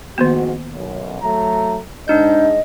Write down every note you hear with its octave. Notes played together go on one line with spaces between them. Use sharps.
F2 G#2 D#3 A#3 B3 F#4
B1 F#2
F#3 A3 A#5
G#2 D4 D#4 D#5 G6